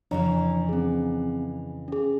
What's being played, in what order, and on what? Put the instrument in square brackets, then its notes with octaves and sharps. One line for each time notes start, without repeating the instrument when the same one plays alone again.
[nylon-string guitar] F2 C#3 E3 [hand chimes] D4 C#5 A#5
[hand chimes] C4 G#4
C#4 G#4